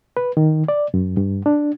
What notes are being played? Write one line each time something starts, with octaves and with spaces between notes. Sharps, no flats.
B4
D#3
D5
F#2
G2
D4